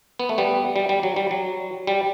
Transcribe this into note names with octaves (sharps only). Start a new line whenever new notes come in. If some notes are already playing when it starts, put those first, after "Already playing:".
B3
A3
G3 B3
G3
G3
F#3
G3
F#3
G3